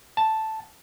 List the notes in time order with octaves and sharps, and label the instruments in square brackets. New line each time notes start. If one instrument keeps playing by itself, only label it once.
[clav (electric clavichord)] A5